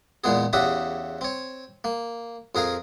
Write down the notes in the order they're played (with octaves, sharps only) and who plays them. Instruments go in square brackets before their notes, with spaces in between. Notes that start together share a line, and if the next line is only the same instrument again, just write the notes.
[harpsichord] E2 A#2 G#3 B3 G#4
E2 C#3 F#4 G4 E5 D#6
C4 C#5
A#3
F2 G#4 A#4 F5 G#5